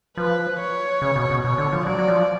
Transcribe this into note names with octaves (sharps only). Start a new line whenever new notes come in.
F3 B4
C#5
C#3
B2
B2
B2 C#5
D3
F3
F#3 D5
F#3
F3